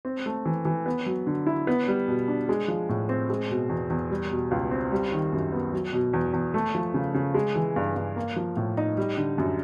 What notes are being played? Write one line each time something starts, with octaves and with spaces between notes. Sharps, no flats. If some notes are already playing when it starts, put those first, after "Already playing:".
C4
A3
E3
E3
B3
F#3
D3
E4
B3
G3
B2
D4
G#3
F3
A2
C4
G#3
B2
E2
E2
G3
B2
C#2
C4
G3
D#3
F#2
B3
F#3
B2
E2
E2
A3
F3
C#3
C#3
G#3
E3
G2
G2
A#3
F3
A2
D#4
G3
D3
F#2